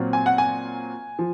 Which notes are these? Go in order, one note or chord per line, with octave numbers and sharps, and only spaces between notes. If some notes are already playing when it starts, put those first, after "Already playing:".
Already playing: A#2 F#3 C4 F4
G#5
F#5
G#5
F3